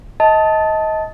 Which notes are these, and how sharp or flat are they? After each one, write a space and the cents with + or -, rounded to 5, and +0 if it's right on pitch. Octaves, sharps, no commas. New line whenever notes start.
D#5 +25 A5 +0